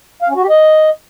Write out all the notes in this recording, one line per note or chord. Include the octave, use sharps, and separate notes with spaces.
F5
C#4
F#4
G4
D#5